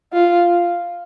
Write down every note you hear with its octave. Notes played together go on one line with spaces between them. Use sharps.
F4